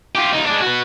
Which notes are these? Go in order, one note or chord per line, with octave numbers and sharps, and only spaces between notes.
F4 G4
C#2 D#4
G#3 D4
F#4 B4